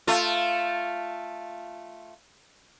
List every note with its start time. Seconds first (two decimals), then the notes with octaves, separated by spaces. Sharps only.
0.07 A3 F4